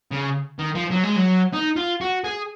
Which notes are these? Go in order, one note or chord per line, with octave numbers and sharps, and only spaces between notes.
C#3
D#3
F3
F#3
G#3
F#3
D#4
F4
F#4
G#4